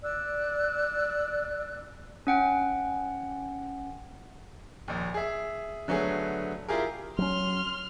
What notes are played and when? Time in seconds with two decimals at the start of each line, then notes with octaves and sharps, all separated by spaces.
0.02 D5 E6 F#6
2.27 C#4 F#5 G5
4.88 A#1 D#2
5.14 G#4 E5
5.88 D3 F#3 A3 B3 G#4
6.69 E4 F4 G4 G#4 A#4
7.18 F#3 C#4 C6 F6